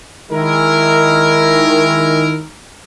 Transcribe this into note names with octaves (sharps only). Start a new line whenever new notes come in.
D#3 G#3 E4 A#4